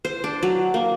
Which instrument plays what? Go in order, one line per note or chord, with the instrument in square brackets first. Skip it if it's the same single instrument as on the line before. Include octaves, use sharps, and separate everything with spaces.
[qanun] C5
D4
F#3
A#3